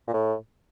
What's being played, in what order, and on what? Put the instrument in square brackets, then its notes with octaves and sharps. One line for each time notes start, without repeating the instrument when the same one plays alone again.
[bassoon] A#2
A2